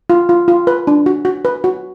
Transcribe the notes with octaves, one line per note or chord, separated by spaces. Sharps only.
F4
F4
F4
B4
D4
F#4
F#4
B4
F#4